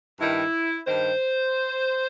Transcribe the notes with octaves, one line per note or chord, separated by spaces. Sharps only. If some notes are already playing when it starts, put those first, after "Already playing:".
G2 D#3 E4
G2 D#3 C5